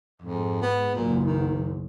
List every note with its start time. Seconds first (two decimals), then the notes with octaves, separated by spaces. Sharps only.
0.22 F2 G#2
0.62 B3
0.95 F#1 B1 F#2 A#2
1.25 D#3